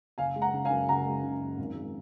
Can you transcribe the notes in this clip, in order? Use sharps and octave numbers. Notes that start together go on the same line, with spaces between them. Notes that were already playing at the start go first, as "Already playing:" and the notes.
F#1 F5 G#5
G#3
F#5 A#5
C#3
F5 G#5
F#2
F#1 F#5 A#5
G#3
C#3
F#2
G#1
G#3